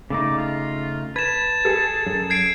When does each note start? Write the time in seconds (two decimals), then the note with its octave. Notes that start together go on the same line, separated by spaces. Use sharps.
0.10 C#3 A3 D#4 D5
0.38 F4
1.16 B4 A5 G#6 E7
1.65 G#4 A4
2.07 F#2
2.30 G#6 C7 D7